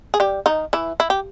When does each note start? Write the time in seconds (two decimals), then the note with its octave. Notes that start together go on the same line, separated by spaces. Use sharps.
0.14 G#4
0.20 G3 G4
0.46 D#3 D#4
0.73 E3 E4
1.00 E4
1.10 G4